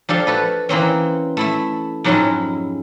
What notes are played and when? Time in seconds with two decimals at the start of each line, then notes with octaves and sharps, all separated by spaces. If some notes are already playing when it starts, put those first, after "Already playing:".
0.09 F3 D4 G4 A4 F5
0.27 F#4 A4 B4
0.69 E3 A#3 C4 C#4
1.37 A3 E4 E5
2.04 F2 G#2 F#3 G#3 C#4 E4